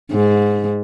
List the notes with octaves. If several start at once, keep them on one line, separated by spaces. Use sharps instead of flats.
G#2